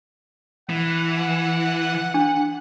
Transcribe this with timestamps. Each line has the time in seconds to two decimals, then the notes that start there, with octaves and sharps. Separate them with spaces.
0.69 E3 F#5
2.14 D4